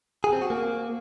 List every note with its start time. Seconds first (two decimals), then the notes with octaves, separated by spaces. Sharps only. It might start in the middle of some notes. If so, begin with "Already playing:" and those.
0.24 G#4
0.33 C4
0.42 F#4
0.50 A#3